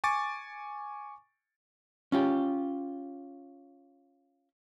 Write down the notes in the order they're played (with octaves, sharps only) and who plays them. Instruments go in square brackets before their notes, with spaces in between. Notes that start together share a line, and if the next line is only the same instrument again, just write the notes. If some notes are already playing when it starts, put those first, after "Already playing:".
[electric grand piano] G#5 C#6 D6 A6 D7
[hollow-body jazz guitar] C#4 F4 G4